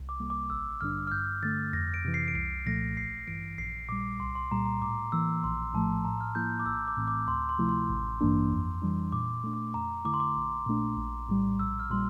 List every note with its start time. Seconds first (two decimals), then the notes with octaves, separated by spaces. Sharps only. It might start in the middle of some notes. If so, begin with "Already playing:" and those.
Already playing: C2
0.09 D6
0.20 C3 G3 A#3
0.30 D6
0.50 A1 E6
0.81 G2 D3 G3 D4 F6
1.07 F6
1.11 G2 G6
1.43 D3 A3 A6
1.73 F2 A#6
1.94 D7
2.05 C3 E3
2.14 C7
2.28 D7
2.35 C2 C7
2.66 A#2 F3 A3 A#6
2.97 A1 C7
3.27 G2 E3 D7
3.58 A#1 C7
3.89 A#2 G3 D6
4.19 C2 C6
4.35 C6
4.51 A#2 G3 A#5
4.66 A#5
4.82 A2 D6
5.12 E3 A#3 E6
5.44 A#1 C6
5.73 A2 F3 A3 A5
6.05 A2 A#5
6.21 F6
6.35 F3 A#3 E4 G6
6.59 D6
6.66 A#1 E6
6.88 D6
6.97 A2 E3 A3 C4
7.08 D6
7.28 D2 C6
7.49 C6
7.58 C3 F3 A3 E4
7.69 C6
7.89 A1
8.21 G2 E3 A#3 D4
8.51 F2
8.82 E3 G3 D4
9.12 A#2 D6
9.44 A3 D4
9.53 D6
9.74 F2 A#5
10.05 D3 A3 E4 D6
10.14 C6
10.20 D6
10.36 A#1
10.66 A#2 A3 D4
10.97 A#1
11.28 A2 G3
11.59 A#1 E6
11.80 F6
11.90 A#2 G3 C6